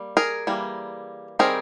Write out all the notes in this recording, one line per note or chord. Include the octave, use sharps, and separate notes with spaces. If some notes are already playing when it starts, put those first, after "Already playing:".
Already playing: G3 A#3
G#4 A#4
E3 G3 A#3
D#3 G3 C4 G#4 A#4